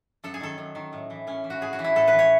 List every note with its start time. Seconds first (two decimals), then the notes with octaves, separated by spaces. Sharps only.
0.24 F#2 A4
0.34 G#4
0.40 D#3 A4
0.58 F#2
0.75 D#3
0.93 A2
1.10 E3
1.27 A2 C#4
1.44 E3
1.50 F#4
1.61 A2 G#4
1.73 F#4
1.79 E3
1.84 E4
1.95 A2 A4
2.08 B4
2.13 E3
2.19 C#5